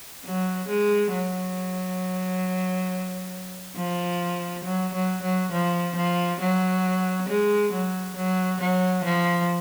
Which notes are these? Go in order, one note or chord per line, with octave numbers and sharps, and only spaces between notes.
F#3
G#3
F#3
F3
F#3
F#3
F#3
F3
F3
F#3
G#3
F#3
F#3
F#3
F3